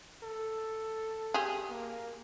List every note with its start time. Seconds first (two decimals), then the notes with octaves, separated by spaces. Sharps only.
0.23 A4
1.34 G4 G#4
1.70 A#3